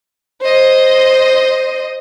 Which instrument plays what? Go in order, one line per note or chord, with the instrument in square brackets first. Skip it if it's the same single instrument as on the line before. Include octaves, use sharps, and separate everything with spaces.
[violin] C5 D#5